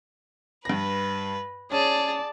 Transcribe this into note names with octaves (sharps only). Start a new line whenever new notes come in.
G2 B4 A#6
C#4 G#4 D5 A5